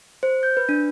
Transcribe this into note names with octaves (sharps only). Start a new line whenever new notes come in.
C5
G6
B4
D4